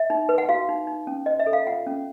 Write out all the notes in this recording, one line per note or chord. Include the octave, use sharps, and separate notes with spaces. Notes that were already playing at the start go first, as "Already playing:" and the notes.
Already playing: E5
D#4
B4
F#5
F#4 F5
D#4
D#4
C#4
C5 D#5
E5
A4
F5
F4 F#5
C#4